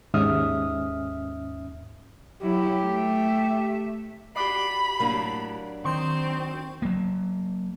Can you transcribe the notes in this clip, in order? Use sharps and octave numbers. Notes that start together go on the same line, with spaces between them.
D#2 G#2 C#4 E5 D#6 F6
F#3 E4 G4
A3 E5
F#4 G4 D5 B5 C7
A2 F#3 A#3 D4
D#3 C4 C6 C#6 G6
F#3 A#3